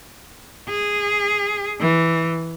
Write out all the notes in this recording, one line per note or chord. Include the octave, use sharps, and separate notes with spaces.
G#4
E3